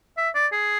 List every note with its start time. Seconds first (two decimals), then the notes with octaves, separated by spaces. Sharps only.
0.17 E5
0.35 D5
0.52 G#4